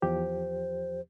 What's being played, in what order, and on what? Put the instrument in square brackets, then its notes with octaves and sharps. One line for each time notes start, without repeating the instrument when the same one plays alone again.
[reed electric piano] E2 F3 G4 [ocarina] C5